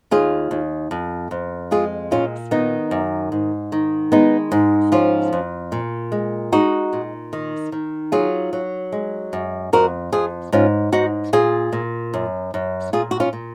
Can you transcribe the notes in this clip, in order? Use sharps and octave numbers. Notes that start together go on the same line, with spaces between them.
D#2 F4 G#4
D#2
F2
F2
G#3 F4 G#4
A#2 C#4 F4
D#3 B3 D#4
F#2
G#2
D#3
G#3 B3 D#4
G#2
F3 C#4 F4
F2
A#2
G#3
G#3 D#4 F#4
A#2
D#3
D#3
F#3 F4 G#4
F#3
G#3
F#2
F2 F#4 A#4
F2 F4 G#4
G#2 C#4 F4
G#2 D#4 F#4
A#2 F4 G#4
A#2
F#2
F#2
A#2 F4 G#4
F#4
C#4 F4
A#2